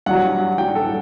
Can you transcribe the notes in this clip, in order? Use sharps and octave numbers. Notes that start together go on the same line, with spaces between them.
G2 F#3 F#5
G2 F#3 G5
A4